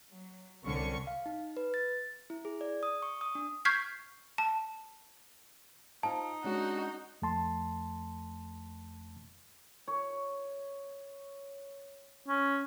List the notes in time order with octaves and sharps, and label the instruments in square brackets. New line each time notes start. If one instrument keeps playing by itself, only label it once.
[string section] F#3
C2 D3 C#4 C#6 C#7
[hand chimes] F5
D#4
B4
A6
E4
G#4
D5
D#6
C#6
D#6
D4
[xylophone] C#6 F6 G6 G#6 B6 C7
A5
[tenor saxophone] D#4 [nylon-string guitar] F4 C5 F5 [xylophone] A5
[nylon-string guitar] G#3 C#4 D4 [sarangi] F#4
[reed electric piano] F2 A3 A5 C6
[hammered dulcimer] C#5
[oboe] C#4